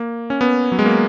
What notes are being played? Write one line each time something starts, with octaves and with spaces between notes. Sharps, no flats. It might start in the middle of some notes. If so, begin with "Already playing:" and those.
Already playing: A#3
C#4
B3
F#3
G#3
A#3